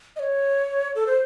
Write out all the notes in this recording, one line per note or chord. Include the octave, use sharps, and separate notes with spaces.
D#5
C#5
A4
C5